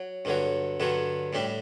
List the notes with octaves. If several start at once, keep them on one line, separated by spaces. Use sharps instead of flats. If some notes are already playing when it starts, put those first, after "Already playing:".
Already playing: F#3
G2 D3 F#3
G2 D3 F#3
A2 G3 D4